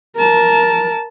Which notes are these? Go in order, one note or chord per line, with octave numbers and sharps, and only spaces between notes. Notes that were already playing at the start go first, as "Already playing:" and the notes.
A#4 A5